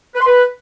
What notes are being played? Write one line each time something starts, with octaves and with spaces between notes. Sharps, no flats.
B4
C6
B4